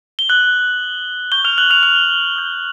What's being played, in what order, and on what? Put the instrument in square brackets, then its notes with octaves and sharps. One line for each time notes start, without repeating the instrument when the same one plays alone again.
[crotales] G7
D#6 F#6 G6 F#7
C#6 F#6 G6 G7
F6 F7
F#6 F#7
F6 F7
F6 F7
D#6 G6